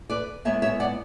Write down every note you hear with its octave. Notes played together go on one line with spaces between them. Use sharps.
B4 D5
G#2 G#3 B3 E4 C#5 E5
C#5 E5
D5 F#5